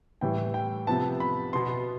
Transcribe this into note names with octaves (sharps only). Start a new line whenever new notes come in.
A2 E3 G3 G5
G5
C3 F3 B3 A5
B5
B2 B3 C6